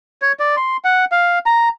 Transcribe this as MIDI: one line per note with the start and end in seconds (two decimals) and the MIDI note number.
0.22 0.32 73
0.39 0.56 74
0.57 0.77 84
0.84 1.05 78
1.12 1.39 77
1.46 1.69 82